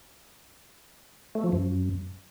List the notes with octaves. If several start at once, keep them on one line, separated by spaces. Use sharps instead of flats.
A3
F3
F#2